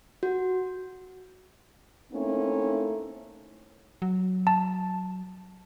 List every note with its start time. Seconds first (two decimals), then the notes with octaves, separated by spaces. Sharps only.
0.23 F#4
2.13 A3 A#3 C4 C#4 D#4 E4
4.02 F#3
4.47 A5